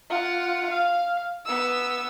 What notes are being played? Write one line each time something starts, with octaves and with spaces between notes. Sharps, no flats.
F4 F#5
F5
B3 E6